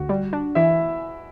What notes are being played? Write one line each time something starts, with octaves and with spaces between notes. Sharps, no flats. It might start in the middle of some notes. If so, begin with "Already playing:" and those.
Already playing: D2 F#4
G3
D4
E3 E4 E5